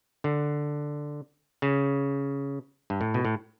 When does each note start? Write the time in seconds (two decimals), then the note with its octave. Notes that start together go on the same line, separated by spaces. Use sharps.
0.24 D3
1.62 C#3
2.90 G2
3.01 A2
3.14 B2
3.25 A2